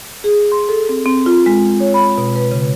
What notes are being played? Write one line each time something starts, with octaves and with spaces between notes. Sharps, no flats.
G#4
C6
A4
C4
C4
F4
G#3
C#5
B5
B2
B4
C#3